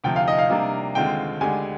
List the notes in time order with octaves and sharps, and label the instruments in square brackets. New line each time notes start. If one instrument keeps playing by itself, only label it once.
[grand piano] D2 C3 F3 [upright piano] G5
[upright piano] F5
D#5
F5
[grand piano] C3 G3 A#3 D4
[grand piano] D#2 D3 G#3 C4 F4 [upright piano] G5
[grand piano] D2 D3 G#3 D4 G4 [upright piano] G#5